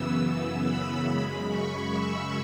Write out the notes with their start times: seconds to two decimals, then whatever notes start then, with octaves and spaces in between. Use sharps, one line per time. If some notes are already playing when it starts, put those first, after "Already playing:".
Already playing: F#2 C#3 E3 B3 E6
0.18 E6
0.61 B5
1.05 F#2 C#3 G#3
1.48 C#6
1.92 E6